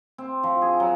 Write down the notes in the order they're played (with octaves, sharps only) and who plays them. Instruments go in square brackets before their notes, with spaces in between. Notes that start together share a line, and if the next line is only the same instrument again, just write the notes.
[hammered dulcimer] C4
F3
G#4
F#3